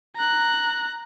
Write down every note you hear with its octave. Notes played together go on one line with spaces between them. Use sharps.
A#5 F#6